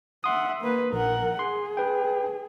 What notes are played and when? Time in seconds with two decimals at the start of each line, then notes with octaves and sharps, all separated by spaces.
0.24 E5 F#5 C6 D#6
0.61 A#3 B4
0.93 A#1 A#4 F#5
1.39 G#4 C6
1.77 B4 G5